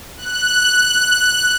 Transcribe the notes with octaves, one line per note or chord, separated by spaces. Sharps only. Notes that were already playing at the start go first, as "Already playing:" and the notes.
F#6